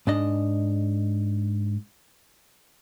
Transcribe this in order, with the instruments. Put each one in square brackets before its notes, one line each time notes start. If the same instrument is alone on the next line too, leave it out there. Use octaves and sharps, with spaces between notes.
[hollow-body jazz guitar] G#2 D4 D#5